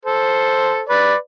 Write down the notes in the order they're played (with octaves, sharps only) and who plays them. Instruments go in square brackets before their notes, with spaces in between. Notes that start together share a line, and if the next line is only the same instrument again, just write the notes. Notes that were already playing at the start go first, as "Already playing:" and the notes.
[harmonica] A4 C5
B4 D5